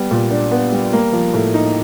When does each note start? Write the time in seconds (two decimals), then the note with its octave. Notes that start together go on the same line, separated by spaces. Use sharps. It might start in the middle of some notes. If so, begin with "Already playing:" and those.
Already playing: G3 B3
0.11 A#2
0.31 D4
0.51 B3
0.72 G3
0.93 A#3
1.13 F3
1.33 A2
1.54 D#4